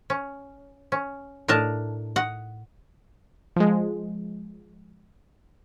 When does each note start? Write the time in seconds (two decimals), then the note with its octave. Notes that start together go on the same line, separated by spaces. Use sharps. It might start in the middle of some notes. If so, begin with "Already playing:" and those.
0.10 C#4
0.92 C#4
1.48 A2 D4 A#4 D#5 A5
2.16 D#5 F#5
3.56 F3 G#3